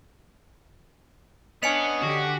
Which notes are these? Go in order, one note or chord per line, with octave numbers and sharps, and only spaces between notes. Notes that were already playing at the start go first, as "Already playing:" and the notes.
B3 C#4 D4 D#5 G#5 C#7 F7
D3 F#4 G4